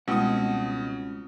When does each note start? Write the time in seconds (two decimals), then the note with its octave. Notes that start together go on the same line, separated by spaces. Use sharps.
0.08 C#2 B2 G3 G#3 C4 E4 F#5 D#6